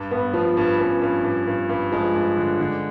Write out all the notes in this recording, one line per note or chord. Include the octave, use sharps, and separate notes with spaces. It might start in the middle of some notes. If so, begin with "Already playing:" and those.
Already playing: G2
G2 B3
F3 B3
G2
G2 C#4
G2
G2
G2
G2
F3 G#3
G2
D3
D3